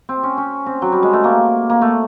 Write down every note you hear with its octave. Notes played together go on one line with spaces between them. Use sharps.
C4
C#4
C#4
C4
F#3
G3
G#3
A3
A#3
A#3
A3